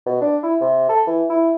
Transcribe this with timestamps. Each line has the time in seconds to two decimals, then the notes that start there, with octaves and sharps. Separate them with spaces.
0.06 B2
0.21 D4
0.43 E4
0.61 C3
0.89 A4
1.07 E3
1.29 E4